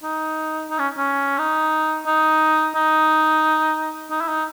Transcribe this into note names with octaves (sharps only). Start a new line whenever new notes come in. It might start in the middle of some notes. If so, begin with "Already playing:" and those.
D#4
D#4
C#4
C#4
D#4
D#4
D#4
D#4
E4
D#4